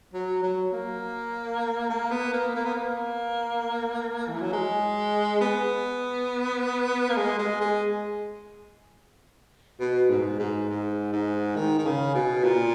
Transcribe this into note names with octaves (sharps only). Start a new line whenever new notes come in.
F#3
F#3
A#3
A#3
B3
A#3
A#3
B3
A#3
E3
F#3
G#3
B3
A#3
G#3
G#3
G#3
B2
G#2
G#2
G#2
G#2
D#3
D#3
C#3
B2
A#2